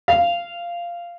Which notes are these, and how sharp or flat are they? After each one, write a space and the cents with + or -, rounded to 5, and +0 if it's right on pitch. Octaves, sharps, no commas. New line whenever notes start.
F5 -10